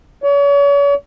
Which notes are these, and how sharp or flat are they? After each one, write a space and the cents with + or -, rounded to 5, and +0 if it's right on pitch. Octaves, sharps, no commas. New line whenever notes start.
C#5 +40